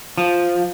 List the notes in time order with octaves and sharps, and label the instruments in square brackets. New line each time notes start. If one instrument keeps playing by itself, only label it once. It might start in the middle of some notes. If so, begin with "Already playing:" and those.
[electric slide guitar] F3